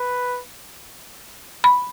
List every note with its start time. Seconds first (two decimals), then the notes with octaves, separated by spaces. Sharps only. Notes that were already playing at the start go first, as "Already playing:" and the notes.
Already playing: B4
1.64 B5